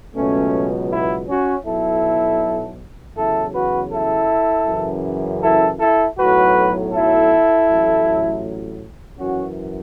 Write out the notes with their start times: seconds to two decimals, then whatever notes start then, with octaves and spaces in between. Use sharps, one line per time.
0.16 C#2 B2 F#3 A3 C#4
0.91 B3 E4
1.28 C#4 F#4
1.66 B1 B2 F#3 E4 A4
3.17 E2 C#3 F#3 E4 A4
3.54 F#4 B4
3.92 E4 A4
4.67 F#2 C#3 E3
5.42 E4 A4
5.80 E4 A4
6.18 B1 A2 F#3 F#4 B4
6.92 E4 A4
7.68 A1 A2 F#3
9.18 F#2 E3 C#4 F#4